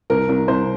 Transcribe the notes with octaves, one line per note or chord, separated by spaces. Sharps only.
C2 A#4
C2
C2 C5